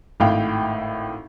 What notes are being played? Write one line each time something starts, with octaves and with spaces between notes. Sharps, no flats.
G#1 A2 F5 G5